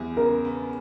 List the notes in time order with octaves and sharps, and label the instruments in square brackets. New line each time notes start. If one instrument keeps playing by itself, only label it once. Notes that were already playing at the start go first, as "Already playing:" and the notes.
Already playing: [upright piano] E2 G3
[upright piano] C#3 [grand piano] A#4
[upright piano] B3